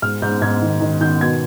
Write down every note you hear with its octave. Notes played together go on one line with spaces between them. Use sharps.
G#2 F6
G#2 G6
G#2 G#6
D#3
D#3
D#3 G6
B2 G#6